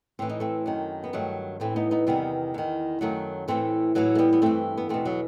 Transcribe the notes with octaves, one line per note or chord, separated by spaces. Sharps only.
A2 E3 C4
D#4
A3 C4
F#2 D#3
B3
G2 D#3 F#3 A3
A2 E3 A3 C4
B3 D#4
B3 D#4
E2 C3 D#3 G3 B3
E2 D#3
F#2 D#3 F#3 A3
A2 E3 A3 C4
A2 E3 F#3 A3
A3
G3 B3
B3
G2 E3 A3 C4
B3
E2 B2 A3 C4
F#3